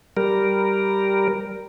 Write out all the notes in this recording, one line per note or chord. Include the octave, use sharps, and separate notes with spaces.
G3 A#4